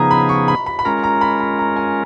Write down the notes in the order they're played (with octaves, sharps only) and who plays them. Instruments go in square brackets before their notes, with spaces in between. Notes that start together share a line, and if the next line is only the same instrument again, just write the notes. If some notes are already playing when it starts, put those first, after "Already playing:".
Already playing: [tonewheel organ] C#3 F3 B3 D#4 G#4 [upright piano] A#5
[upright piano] B5
C#6
B5
B5
B5
[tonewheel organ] G#3 C#4 F4 A#4 [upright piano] A#5
[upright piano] A#5
B5
B5
A#5
G#5